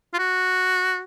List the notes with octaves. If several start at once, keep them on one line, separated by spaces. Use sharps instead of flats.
F4
F#4